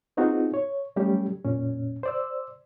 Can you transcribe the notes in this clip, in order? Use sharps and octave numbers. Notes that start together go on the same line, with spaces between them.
B3 C4 D#4 F4 F#4 G#4
C#5
F#3 G3 A3 C#4 G4
F#2 A#2 C#4
C5 D5 E6